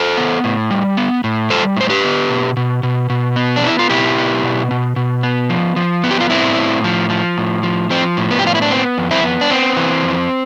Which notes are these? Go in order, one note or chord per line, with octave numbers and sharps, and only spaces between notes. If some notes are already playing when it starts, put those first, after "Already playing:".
Already playing: A4 C5
B3
A2
G3
B3
A2
G3 A4 C5
A2 C5
G4 B4
B3
B2
B2
B2
B2
B3
D4
B3 E4
F4
B2 E4 G4
B3
B2
B2
B2
B3
F3
F3
B3
G4
F4
A2 C4 E4
A2
F3
F3
A2
F3
F3 C4
A2
B3
G4
B3 F4
E4
D4
B3 C4
F2
C4 E4
B3
D4
B3 C4
E3
F2